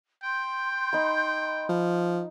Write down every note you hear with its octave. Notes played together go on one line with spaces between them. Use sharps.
G5 C6 G6
D#4 B5
F3